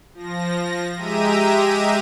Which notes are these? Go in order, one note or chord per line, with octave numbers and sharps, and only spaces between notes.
F3 A#6
G#3 G4 E5 A#5 D#7